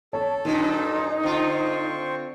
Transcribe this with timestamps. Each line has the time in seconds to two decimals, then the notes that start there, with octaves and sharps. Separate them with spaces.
0.13 A4 C#5 A5
0.45 F#2 A#2 D#3 D#4
1.23 D3 C4 F4 C5 C#6